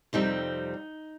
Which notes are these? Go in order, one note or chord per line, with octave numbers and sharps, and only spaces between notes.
F2 C3 G3 C4 D#4